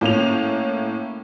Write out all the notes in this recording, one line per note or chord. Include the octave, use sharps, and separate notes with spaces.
A2 A#3 C#4 F7